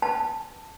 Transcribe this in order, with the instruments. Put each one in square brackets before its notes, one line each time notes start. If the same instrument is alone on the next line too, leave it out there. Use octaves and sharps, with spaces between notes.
[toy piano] A5